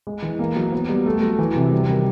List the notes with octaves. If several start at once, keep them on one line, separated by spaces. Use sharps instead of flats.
G#3
E3
A#3
F#3
B3
G3
A3
F#3
E3
C3
G3
D#3